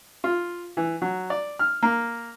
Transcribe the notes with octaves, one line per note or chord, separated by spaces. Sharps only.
F4
E3
F#3
D5
F6
A#3